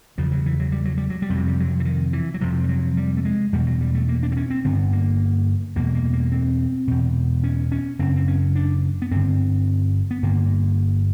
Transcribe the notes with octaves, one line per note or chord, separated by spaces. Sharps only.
E2 C#3 F3
F#3
E3
F#3
G3
F#3
G3
F#3
G3
F2 C3
F#3
G3
F#3
E3
D#3
E3
F#3
F2 C3 F3
G3
F#3
G3
A3
G#3
E2 B2 G3
F#3
G3
A3
A#3
D4
C4
C#4
C4
G2 D3 B3
A#3
E2 B2 A#3
A#3
A#3
C4
E2 B2
C#4
C#4
F#2 C#3 C4
C4
C#4
D4
B3
G2 D3 C4
B3
G2 D3 A#3